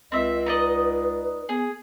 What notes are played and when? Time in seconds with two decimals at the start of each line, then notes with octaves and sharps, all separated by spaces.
0.12 C#2 C4 D#5 E5
0.46 D#4 B4 D5 D#5
1.49 B3 G#4